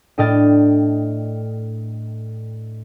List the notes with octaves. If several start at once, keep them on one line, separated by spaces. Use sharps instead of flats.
A2 D4 D#5 G5 F6 A6